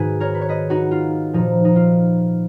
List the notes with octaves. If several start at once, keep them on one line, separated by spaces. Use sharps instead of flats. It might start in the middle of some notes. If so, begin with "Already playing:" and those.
Already playing: G#2 D#3 F#4 G#4 B4
A#4 C#5
B4
C#5
B4 D#5
D#4 F#4
F4
A#2 F3 D#4
D#4
F4